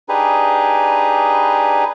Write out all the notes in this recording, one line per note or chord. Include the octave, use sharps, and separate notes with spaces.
D4 D#4 G4 G#4 B4